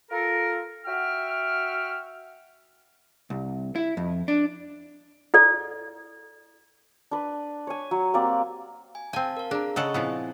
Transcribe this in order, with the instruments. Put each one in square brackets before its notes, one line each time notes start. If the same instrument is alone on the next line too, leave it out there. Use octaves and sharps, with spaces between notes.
[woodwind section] F4 A4 A#4
F#4 E5 F#5 G5 F6
[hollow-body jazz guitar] C2
E4
F2
D4
[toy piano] E4 A4 D5
[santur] D4 B4
C#5 G#5
F#3
A#3 C4 G4 D5
[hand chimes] G#5
[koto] C4 G#5 [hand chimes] F5 A5
[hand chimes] A#4 F5
[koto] D4 [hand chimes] G#4 A#5
[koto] C#3 A4 F#5 [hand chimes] D#5 C#6 D#6
[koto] A#2 F3 B3 [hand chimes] C4 E4 G#5